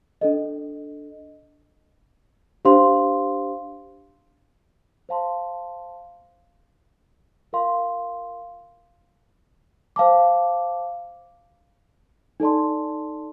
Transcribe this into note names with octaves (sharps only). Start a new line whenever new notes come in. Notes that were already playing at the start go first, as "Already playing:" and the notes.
D4 A4 D#5
D4 G4 C5 F5 C6
C5 F5 A5 C6
F4 A#4 F5 C6
C5 F5 A5 D6
D#4 A4 D5 A5 C6